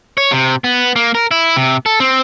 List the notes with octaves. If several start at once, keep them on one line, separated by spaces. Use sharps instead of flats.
C#5
C3
B3
A#3
A#4
E4
C3
A4
C4